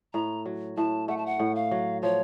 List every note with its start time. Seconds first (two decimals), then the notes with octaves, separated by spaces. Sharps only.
0.14 A2 A#5
0.46 F#3
0.77 A2 A5
1.08 A3 F#5
1.17 A5
1.26 F#5
1.40 A2
1.55 F5
1.71 F#3
2.02 F3 C#5